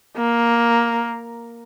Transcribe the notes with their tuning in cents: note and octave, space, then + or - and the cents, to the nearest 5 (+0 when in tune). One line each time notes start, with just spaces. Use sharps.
A#3 +5